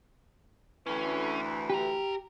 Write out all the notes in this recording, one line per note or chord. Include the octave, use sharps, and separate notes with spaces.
D2 E3 C#4
G4 B4 A#5